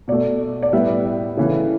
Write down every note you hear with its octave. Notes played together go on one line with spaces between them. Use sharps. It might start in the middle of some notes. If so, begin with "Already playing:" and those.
B2 A3 D5
D5
A2 G3 B3 E5
C#3 E3 A3